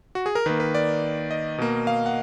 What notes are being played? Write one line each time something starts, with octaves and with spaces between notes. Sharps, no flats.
F#4
G#4
A#4
D#3 A#3 B4
B4
D5
D#5
B2 A#3
F5
F#5